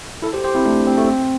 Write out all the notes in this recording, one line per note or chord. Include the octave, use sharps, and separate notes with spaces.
E4 A4
G4 C5
G4 C5
C4 E4
A3 D4
C4
A3
C4